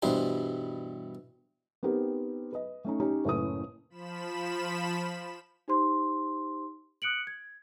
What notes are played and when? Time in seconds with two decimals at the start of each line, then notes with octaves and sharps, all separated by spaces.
0.02 G2 B2 E3 G3 C5
1.83 B3 C4 D#4 G4 A#4
2.53 B4 D#5
2.85 A3 C#4 D#4
3.00 C#4 D#4 G4 C#5
3.25 F#1 A2 A3 C#4 B4 D#6
3.90 F3 B5 E7
5.68 D#4 G4 C5 C6
7.02 D#6 F#6 C#7 D7 F#7
7.27 G#6